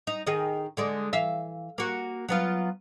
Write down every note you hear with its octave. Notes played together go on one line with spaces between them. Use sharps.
D#4
D#3 G#4 D#5
D3 G#3 D5
E3 E5 F5
A#3 F#4
F#3 B3 F4